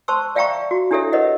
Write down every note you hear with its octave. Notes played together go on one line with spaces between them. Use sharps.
C5 A5 C6 C#6 E6
D5 E5 F5 G5 A#5 C#6
F#4
D4 E4 G4 A4 C#5 E5
A#4 B4 C#5 D#5 E5 F#5